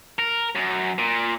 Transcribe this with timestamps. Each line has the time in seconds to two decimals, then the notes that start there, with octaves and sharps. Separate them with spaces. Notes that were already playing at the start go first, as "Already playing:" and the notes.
0.19 A#4
0.56 F#2
0.98 A#2